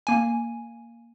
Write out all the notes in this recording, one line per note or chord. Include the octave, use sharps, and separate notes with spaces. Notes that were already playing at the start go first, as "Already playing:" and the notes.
A#3 G#5